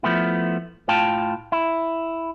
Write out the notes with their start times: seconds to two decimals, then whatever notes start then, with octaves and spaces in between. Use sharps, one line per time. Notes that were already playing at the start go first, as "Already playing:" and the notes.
0.03 F3 A3 B3 E4
0.88 A2 F4 F5 G5 A5
1.52 E4